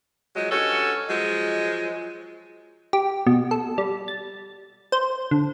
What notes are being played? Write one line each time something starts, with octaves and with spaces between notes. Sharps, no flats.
F3 F#3 G#3
G2 C#4 F#4 A4
F3 F#3 G#3
G4
B2
A4
G3
A6
C5
D3